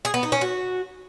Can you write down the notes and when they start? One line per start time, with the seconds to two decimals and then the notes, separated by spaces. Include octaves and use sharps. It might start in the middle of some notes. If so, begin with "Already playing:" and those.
0.05 G#4
0.14 B3
0.23 D#4
0.32 C#4
0.41 F#4